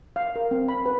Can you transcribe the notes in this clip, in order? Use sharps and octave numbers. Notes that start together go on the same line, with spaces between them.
F5
A#4
C4
B5
B4